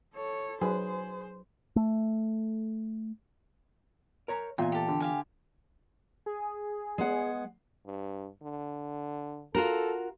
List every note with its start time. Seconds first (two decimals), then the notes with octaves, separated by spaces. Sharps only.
0.15 A4 C#5
0.61 F#3 D#4 G#4 B4 C5
1.76 A3
4.28 A#4 C#5 A#5
4.58 A#2 E3 B3 F4 G5 G#5
4.72 G4 A4
4.88 D3
5.00 G4 F5 G#5
6.26 G#4
6.98 G#3 B3 F#5
7.86 G2
8.43 D3
9.55 F4 F#4 A4 A#4